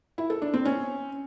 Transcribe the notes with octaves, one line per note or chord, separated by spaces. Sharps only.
E4
A4
D4
C4
C#4